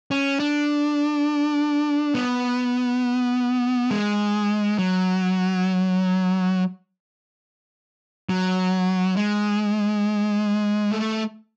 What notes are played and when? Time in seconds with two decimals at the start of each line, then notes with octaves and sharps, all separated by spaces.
0.11 C#4
0.40 D4
2.15 B3
3.91 G#3
4.79 F#3
8.29 F#3
9.16 G#3
10.92 A3